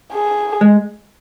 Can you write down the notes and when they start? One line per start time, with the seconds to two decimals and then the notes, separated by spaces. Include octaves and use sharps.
0.13 G#4
0.61 G#3